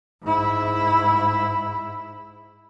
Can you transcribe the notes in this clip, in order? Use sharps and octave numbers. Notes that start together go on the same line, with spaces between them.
G#2 E4